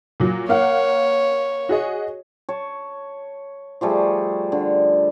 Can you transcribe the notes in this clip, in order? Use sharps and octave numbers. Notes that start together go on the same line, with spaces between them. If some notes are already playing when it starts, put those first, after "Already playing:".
A#2 F#3
A#3 C#5 F5 F#5
F#4 G#4 D#5
C#5 A5
F3 G3 A3 G#4
D3